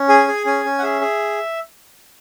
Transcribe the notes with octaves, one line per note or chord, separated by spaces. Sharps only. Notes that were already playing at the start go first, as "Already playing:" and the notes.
Already playing: C#4
G#4 G#5
G#4
C#4 G#5
C#4
F#5
G#4 E5
G#4